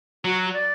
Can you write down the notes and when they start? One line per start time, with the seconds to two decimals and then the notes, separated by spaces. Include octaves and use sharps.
0.25 F#3 F#4
0.54 D5